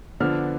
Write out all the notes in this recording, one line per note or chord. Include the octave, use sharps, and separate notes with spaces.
D3 F3 B3 D4 F6